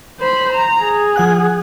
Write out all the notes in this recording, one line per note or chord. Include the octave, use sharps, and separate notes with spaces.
C5 B5
A#5
G#4
F3 F#5 F#6